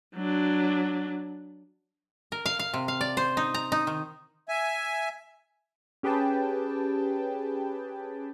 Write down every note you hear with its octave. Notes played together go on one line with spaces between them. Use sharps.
F#3 D4
A#4
F5
F5
C3
F5
D5
C5
D#4
A#5
D#4
D#3
E5 G#5
C#4 G4 G#4 B4 G5 A5